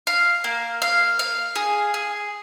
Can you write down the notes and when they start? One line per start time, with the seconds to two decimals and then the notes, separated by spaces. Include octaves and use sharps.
0.07 F5
0.44 A#3
0.82 F5
1.19 F5
1.56 G#4
1.94 G#4